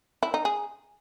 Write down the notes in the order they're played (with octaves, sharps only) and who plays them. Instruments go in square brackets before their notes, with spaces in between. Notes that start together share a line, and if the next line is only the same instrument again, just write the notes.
[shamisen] E4
D#4
G#4